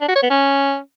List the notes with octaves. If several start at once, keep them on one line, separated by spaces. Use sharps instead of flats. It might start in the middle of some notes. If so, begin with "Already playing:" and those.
D4
F#4
C#5
B3
C#4